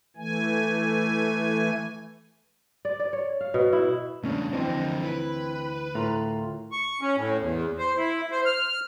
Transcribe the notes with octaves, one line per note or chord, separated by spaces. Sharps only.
E3 A3 G#5
D5
D5
C#5
F5
B2
E4
E2 C#3 A3 C#4 D4
D2 D3 E3 F3 C4 D#5 G5
E4 B4
A2 F4 A#4 A#5
C#6
C#4
A2
E2
C5
E4
C5
F6